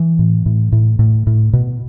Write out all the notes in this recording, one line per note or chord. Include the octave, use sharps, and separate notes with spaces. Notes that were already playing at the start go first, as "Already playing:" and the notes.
Already playing: E3
A2
A2
A2
A2
A2
B2